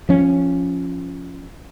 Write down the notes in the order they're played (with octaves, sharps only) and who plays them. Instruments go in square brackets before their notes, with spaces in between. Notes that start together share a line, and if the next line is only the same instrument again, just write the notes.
[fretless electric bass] F3 C#4